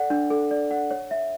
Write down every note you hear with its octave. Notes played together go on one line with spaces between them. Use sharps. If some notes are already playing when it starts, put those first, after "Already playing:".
Already playing: A4 D5 F#5
D4
A4
D5
F#5
C#5
E5